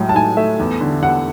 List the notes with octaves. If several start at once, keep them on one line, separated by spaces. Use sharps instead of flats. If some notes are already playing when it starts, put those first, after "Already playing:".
Already playing: A2 F#3 G#3
A5
A2 G#5
A3 E5
E2
D3
E2 F#5